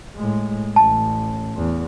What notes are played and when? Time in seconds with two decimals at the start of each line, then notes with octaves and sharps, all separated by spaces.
0.16 A2 G#3
0.76 A1 A5
1.56 E2